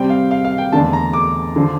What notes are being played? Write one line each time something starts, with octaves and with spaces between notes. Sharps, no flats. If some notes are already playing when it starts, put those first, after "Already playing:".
Already playing: C3 G3 C4 G5
F5
F5
F5
G5
E2 D3 A3 D4 A5
A#5
D6
D3 F3